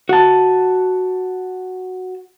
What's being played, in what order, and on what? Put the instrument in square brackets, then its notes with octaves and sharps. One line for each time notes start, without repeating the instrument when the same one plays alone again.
[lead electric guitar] F#4 A5